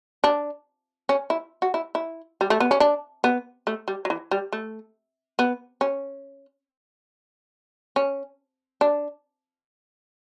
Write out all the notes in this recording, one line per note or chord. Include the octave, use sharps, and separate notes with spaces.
D4
C#4
E4
F#4
E4
E4
G3
A3
B3
C#4
D4
B3
A3
G3
F#3
E3
G3
A3
B3
C#4
C#4
D4